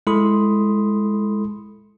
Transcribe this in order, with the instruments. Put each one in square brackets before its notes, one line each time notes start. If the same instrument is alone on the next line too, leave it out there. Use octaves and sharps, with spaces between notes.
[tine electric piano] G#3 E4 A4 B5 C6 D#6